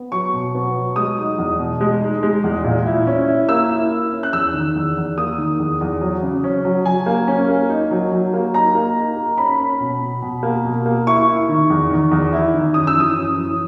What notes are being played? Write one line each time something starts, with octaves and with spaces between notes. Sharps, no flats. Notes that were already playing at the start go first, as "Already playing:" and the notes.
Already playing: B3
F#3 C#6
B2
B3
F#3
G#3 D#6
D#4
E2
B2
G#3
D#4
G#3
E2
A#2
E4
C#4
E4
A#3 E6
E4
E4
C#4
F#6
E2 E6
D#3
E2
E2
A#3 D#6
D#3
E2
E2
F#3
C#3
C#4
F#3
F#3 G#5
A#3
C#4
A#3
D#4
F#3
F#3
A#3
D#4 A#5
A#3
D#4
A#3
C#4 B5
C#4
B2
B2
B2
A#3
B2
A#3
E4 C#6
E4
D#3
E2
D#3
E2
E4
D#3
F#2 D#6
E6
E3 D#6
F#2
E3